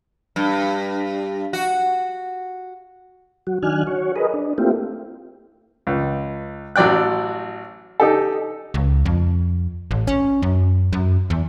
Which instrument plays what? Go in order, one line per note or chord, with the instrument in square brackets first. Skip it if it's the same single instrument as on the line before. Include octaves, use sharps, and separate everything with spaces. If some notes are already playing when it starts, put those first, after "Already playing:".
[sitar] G2
F#4
[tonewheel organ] F#3 F#4
D#3 F#3 D4 G#5 F6 F#6
F#4 C#5
G#4 A#4 B4 D#5
D4
A3 A#3 C4 E4 F4 G4
[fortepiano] C#2
A1 F#3 D5 G5 F#6
D#4 G4 A4
[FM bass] C#2
F2
A1
C#4
F#2
F#2
E2